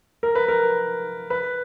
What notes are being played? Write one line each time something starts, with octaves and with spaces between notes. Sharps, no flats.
A#4
B4
A#4
B4